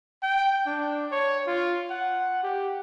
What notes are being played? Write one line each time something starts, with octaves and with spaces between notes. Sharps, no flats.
G5
D4
C#5
F4
F#5
G4